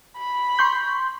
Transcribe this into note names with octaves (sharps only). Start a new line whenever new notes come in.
B5
C6 C#6 G6